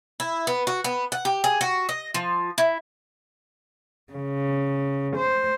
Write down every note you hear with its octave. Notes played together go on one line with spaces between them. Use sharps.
E4
B3
F#4
B3
F#5
G4
G#4
F#4
D#5
F3
E4
C#3
C5